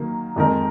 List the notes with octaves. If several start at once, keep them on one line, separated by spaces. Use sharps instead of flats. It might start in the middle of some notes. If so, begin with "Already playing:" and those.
Already playing: D#3 F#3 A#3
F2 D#3 G#3 D#4 A#4